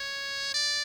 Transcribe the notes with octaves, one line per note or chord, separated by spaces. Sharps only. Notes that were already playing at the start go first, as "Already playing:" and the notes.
Already playing: C#5
D5